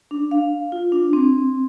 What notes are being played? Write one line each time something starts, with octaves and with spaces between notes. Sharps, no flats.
D4
F5
F4
D4
C4